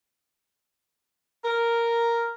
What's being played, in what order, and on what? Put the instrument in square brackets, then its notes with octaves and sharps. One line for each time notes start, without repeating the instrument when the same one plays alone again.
[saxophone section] A#4